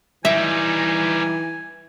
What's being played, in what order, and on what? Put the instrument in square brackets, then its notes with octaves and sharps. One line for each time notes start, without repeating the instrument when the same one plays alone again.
[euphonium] E3 [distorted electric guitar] G3 D#4 [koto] E5 [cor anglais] G#5